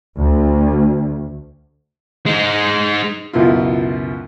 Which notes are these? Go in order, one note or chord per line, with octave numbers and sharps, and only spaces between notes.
D2
G#3 D#4
C#2 F#2 B2 E4 F4